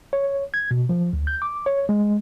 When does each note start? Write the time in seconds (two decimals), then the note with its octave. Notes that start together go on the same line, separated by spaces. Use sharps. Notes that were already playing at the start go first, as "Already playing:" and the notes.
0.13 C#5
0.54 G#6
0.71 B2
0.89 F3
1.13 D2
1.27 G6
1.42 D6
1.66 C#5
1.89 G#3